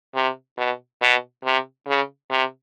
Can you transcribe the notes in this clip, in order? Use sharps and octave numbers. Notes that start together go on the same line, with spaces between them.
C3
B2
B2
C3
C#3
C3